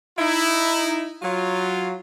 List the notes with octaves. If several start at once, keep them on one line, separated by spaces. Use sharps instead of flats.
D#4 E4
F#3 F4